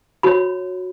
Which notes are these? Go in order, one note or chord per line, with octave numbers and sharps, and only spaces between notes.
F#4 C#5 B5